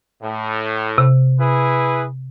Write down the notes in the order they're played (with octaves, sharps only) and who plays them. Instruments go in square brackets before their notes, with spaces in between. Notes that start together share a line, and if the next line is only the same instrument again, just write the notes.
[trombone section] A2
[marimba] C3
[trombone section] E4 G#4 B4